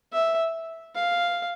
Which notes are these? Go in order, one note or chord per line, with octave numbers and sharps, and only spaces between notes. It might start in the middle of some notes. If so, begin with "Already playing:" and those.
E5
F5